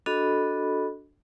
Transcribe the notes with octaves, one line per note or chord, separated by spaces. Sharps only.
D4 F#4 A4 D#5 B5